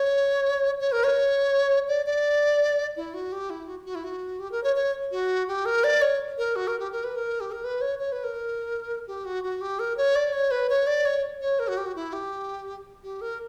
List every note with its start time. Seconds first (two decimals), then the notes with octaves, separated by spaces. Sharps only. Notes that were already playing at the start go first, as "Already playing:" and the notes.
Already playing: C#5
0.80 C#5
0.92 A#4
1.04 C#5
1.88 D5
2.06 D5
2.96 E4
3.14 F#4
3.32 G4
3.50 E4
3.68 F#4
3.86 F#4
3.95 E4
4.04 F#4
4.39 G4
4.52 A#4
4.64 C#5
4.76 C#5
5.12 F#4
5.48 G4
5.65 A#4
5.84 D5
6.02 C#5
6.38 A#4
6.56 F#4
6.68 A#4
6.80 G4
6.92 A#4
7.04 B4
7.16 A#4
7.40 G4
7.52 A#4
7.64 B4
7.81 C#5
7.99 C#5
8.12 B4
8.24 A#4
9.07 G4
9.25 F#4
9.44 F#4
9.61 G4
9.79 A#4
9.97 C#5
10.16 D5
10.33 C#5
10.51 B4
10.69 C#5
10.87 D5
11.06 C#5
11.41 C#5
11.59 A#4
11.68 F#4
11.77 G4
11.86 F#4
11.96 E4
12.13 G4
13.03 G4
13.21 A#4